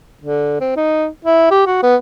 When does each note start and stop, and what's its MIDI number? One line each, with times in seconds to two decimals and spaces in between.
0.22 0.58 50
0.61 0.74 60
0.76 1.07 63
1.25 1.49 64
1.51 1.64 67
1.66 1.83 66
1.83 1.96 59